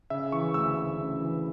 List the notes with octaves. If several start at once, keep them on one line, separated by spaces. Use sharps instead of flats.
C#3 E5
E3 C#6
D2 E6
D2
C#3
E3